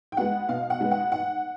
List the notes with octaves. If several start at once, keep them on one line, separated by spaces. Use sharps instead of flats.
G5
G#3 B3 F#5
B2 F5
F#5
G#3 B3
F#5
G#2 F#5